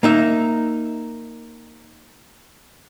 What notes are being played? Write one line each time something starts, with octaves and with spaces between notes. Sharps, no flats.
A#3 D#4 E5